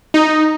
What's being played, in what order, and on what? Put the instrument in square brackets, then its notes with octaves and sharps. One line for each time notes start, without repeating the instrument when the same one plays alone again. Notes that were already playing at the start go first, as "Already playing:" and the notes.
[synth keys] D#4